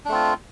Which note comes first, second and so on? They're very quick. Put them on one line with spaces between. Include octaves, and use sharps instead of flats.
D4 A3 C4 F4